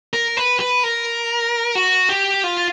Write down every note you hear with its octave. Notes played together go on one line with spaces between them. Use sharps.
A#4
B4
B4
A#4
F#4
G4
F4